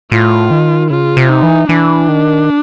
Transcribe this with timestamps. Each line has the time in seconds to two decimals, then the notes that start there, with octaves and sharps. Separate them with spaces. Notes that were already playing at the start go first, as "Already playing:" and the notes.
0.12 A2 F4
0.51 D#3
0.90 C#3 F4
1.17 C3
1.29 D#4
1.43 E3
1.69 E3 D4
2.09 D#3